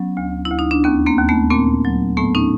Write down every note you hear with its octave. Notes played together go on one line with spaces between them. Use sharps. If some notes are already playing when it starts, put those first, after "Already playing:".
Already playing: F#3 B3 C#4
D2
E4
D2
D#4
D4
D#2 B3 C#4
A#3 C4
D#2
A3 B3
A#2 A#3 C4
F#3
A2 A3 B3
C#4 D#4